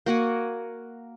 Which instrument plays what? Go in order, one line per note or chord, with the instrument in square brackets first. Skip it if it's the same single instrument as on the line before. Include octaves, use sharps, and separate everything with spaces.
[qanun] A#3 F#4 F#5 G#5